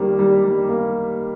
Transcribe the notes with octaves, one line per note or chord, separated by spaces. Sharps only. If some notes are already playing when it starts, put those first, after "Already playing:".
Already playing: D#3 G3 A#3
G3
G3
A#3